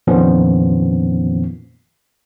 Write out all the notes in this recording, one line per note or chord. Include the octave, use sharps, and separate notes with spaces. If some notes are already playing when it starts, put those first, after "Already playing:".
F2 A#2 D#3 F3 B3 C#4